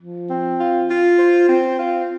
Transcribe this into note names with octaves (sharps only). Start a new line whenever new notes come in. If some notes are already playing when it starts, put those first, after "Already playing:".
F3
C4
F4
F4
C5
C4
F4